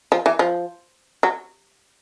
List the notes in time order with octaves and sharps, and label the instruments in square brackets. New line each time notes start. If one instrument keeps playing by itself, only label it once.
[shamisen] F3
E3
F3
F#3